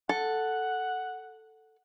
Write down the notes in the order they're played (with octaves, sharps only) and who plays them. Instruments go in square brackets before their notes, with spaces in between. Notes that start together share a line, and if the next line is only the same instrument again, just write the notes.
[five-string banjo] A4 [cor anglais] F#5